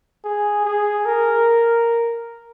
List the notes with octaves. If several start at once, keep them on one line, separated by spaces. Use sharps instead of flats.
G#4
G#4
A#4